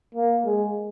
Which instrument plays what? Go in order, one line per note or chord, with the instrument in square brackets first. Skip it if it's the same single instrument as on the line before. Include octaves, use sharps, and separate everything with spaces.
[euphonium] A#3
G#3